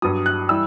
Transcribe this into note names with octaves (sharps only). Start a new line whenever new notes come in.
G2 F#3 D#6
F#6
E3 G3 E6